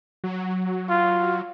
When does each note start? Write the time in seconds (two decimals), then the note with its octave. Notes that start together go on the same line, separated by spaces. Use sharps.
0.24 F#3
0.90 F4